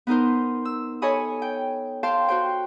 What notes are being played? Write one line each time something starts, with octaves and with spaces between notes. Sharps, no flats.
B3 D#4 A#4 C5
E6
A4 C#5 D#5 G#5 B5 D#6
G5
C5 F5 G5 A5 C6
F#4 C5 G5